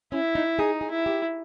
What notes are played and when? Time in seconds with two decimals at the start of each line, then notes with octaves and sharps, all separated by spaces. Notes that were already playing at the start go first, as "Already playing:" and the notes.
0.12 C#4 E4
0.35 D#4
0.59 D#4 G#4
0.81 G#4
0.90 E4
1.06 G4